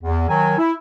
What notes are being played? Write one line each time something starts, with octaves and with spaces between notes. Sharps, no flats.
E2
D#3 F#3 G#5
E4